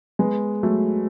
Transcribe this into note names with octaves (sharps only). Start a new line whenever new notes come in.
G#3 B3
F#3 A3